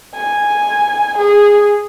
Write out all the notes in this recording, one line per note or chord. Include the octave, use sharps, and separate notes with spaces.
G#5
G#4